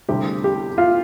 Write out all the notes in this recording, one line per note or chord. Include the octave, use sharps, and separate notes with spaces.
D2 C3 G3 G4
G4
F4